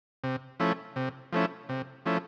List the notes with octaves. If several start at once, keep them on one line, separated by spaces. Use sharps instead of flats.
C3
F3 A3 C#4 E4
C3
F3 A3 C#4 E4
C3
F3 A3 C#4 E4